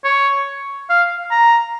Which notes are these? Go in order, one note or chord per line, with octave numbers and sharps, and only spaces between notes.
C#5
F5
A#5